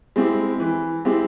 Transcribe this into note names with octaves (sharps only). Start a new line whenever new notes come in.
G#3 C4 E4 G4
E3
G#3 C4 E4 G4